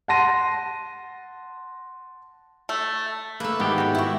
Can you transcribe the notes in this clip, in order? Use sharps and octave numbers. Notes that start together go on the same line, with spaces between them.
F#5 A5 C6 A#6 D#7
A3
A3 A#3 B4 E5
G#2 D#3 B3 G4
F#4 G5
E4 C#6